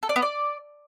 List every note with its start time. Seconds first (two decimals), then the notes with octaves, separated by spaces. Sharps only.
0.03 A4
0.09 D5
0.16 B3
0.22 D5